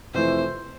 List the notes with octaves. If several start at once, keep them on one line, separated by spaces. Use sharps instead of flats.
F2 C3 E3 A3 E4 C5